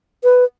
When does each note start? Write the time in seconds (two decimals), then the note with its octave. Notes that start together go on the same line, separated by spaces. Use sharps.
0.24 B4